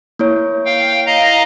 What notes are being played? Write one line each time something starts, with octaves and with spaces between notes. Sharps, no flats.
A#3 E4 C#5
F5 G5
D#5 F5 A#5